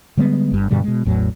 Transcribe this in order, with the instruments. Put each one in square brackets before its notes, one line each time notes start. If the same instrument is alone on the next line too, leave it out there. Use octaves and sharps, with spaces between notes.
[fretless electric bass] D3 G3 G#3 B3
G1 G2
G2 B2 D3 G3
B2 G#3
A1 E2 A2 F#3